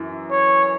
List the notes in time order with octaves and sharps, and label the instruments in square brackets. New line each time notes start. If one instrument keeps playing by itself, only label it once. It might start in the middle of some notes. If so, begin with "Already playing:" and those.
Already playing: [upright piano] F#2 E3
[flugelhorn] C#5